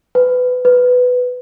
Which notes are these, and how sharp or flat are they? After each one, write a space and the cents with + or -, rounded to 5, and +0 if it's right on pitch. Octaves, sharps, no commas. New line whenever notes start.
B4 +20
B4 +10